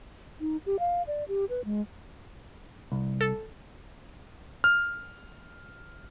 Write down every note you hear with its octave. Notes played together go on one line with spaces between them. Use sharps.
D#4
G4
F5
D5
G4
B4
G#3
C2
A4
F6